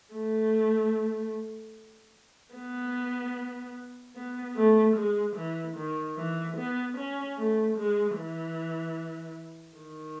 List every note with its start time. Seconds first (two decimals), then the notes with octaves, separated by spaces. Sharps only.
0.14 A3
2.55 B3
4.16 B3
4.57 A3
4.96 G#3
5.36 E3
5.77 D#3
6.17 E3
6.57 B3
6.97 C#4
7.38 A3
7.78 G#3
8.18 E3
9.79 D#3